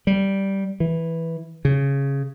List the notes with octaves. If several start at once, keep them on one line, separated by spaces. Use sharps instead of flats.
G3
E3
C#3